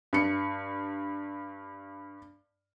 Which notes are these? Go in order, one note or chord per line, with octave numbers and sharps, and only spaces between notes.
G2 C#7